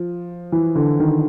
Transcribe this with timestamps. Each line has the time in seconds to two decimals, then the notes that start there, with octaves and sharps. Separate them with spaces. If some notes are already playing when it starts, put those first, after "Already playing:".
Already playing: F3
0.52 E3
0.75 D3
1.00 D#3